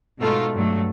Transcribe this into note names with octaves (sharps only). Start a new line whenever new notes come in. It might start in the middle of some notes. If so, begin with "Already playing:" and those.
G#2 B2 A3 D#4 F4
G2 F#3 A3